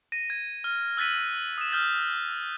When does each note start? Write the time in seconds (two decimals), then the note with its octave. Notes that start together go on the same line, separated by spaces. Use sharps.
0.12 A#6 D#7
0.30 G#6
0.64 F6
0.97 E6 F#6 A6 B6 D#7
1.58 D#6 E7
1.72 D#6 F6 G6 A6